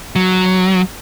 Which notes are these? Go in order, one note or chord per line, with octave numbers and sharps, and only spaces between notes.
F#3